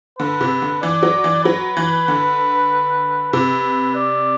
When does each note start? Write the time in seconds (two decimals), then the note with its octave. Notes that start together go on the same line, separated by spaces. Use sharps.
0.19 D3 B4
0.41 C3
0.62 D3
0.82 E3 D5
1.03 F#3
1.24 E3
1.44 F#3 B4
1.77 E3
2.08 D3
3.32 C3 B4
3.96 D5